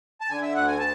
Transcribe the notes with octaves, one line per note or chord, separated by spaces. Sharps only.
A5
D3 G#5
E5
D2 F#5
G#5
A5